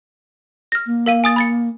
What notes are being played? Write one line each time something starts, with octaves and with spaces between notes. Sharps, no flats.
F6 A#6
A#3
A#4 F5 D#7
G#5 D#6 A6
B5 A6 C#7